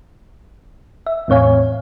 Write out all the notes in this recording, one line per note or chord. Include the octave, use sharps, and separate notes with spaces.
E5
E2 A2 C4 C#5 F5 G#5